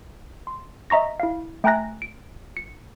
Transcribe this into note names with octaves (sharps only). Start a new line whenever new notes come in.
C6
D#5 E5 A#5 C#6 A#6
E4 F5
A3 G5 G#5 A#5 F#6 A#6
D7
C#7